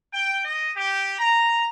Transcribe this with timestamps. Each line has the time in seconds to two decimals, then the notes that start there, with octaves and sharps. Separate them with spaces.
0.13 G5
0.45 D#5
0.77 G4
1.19 A#5